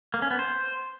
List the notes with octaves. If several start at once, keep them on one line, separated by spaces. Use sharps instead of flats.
A#3
C#4
B3
C5